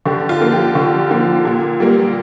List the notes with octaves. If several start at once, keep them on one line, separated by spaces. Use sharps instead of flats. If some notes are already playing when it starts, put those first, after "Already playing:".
D3 G4
F4
F3 A#3
G4
D3
F3 A#3
A#2
G3 A#3